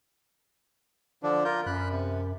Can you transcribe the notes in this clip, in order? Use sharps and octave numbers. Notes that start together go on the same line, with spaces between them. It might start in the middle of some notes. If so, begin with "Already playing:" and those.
D3 F3 D4
F4 A#4 G6
F#2 B5 F#6
C3